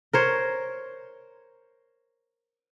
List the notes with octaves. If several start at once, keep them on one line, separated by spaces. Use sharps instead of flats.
A#4 C5 C#5